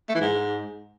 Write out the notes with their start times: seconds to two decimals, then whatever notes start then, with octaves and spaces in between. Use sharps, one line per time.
0.09 A3
0.15 E3
0.21 G#2